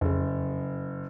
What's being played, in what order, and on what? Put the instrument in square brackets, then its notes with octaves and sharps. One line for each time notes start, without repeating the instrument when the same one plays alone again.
[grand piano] F#1 [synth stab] F2 C#3